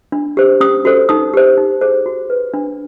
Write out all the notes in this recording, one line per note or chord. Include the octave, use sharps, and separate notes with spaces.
D4
G4 C5
C#4 D#6
F#4 A4 C5
D#4 D#6
G4 C5
D#4
G#4 C5
F#4
B4
D4